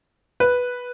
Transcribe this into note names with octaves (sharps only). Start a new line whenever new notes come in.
B4